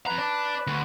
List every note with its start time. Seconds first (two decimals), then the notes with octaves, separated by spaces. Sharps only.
0.07 F2 B4 A#5
0.18 D5 A5
0.67 D2